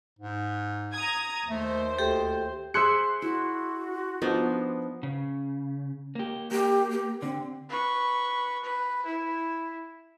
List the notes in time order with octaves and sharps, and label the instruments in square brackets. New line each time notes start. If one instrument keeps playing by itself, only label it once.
[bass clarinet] G#2
[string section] A#5 D#6 G#6
[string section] D#2 C5 [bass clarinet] A3
[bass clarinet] D2 [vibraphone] G4 A4 G5
[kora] G#4 C5 E5 [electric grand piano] C6 F#6 C#7
[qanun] E4 [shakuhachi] F#4
[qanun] F3 B3 D4 [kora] D#4
[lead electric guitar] C#3
A#3 G4
[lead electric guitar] A#3 [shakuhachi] G4
[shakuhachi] G4
[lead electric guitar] D3 [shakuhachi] C4
[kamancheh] B4 C#6
B4
E4